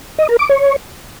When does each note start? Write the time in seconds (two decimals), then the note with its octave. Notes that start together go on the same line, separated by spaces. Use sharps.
0.19 D#5
0.29 A#4
0.39 D6
0.49 C#5